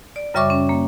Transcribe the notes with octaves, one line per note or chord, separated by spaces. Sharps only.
D5
F#2 C#3 G3 E5 C#6 D6
C#4
A#3